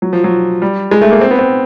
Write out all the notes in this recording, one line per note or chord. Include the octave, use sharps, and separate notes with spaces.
F#3
F3
F#3
G3
G#3
A3
A#3
C4
B3
C4